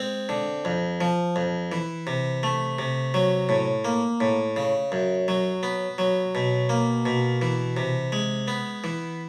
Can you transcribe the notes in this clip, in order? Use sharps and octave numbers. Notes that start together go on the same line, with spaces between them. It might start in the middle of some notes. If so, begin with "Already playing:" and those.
Already playing: G#3 C4
D3
F2
F3
F2
E3
C3
A3
C3
F#3
A2
A#3
A2
C#3
F#2
F#3
B3
F#3
B2
A#3
B2
E3
C3
G#3
B3
E3